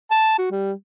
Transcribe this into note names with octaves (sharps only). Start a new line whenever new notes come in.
A5
F#4
G3